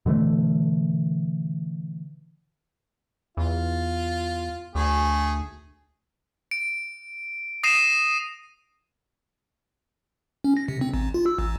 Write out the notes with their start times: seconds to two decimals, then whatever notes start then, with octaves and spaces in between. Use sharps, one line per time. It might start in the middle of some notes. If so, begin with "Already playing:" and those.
0.06 B2 D3 E3 A3
3.37 E2 F4
4.75 D2 A3 G#4
6.51 D7
7.63 D#6 A#6 C7 D#7 E7
10.44 C#4
10.57 A#6
10.68 C3
10.81 C4
10.94 A1
11.14 F4
11.26 E6
11.39 A1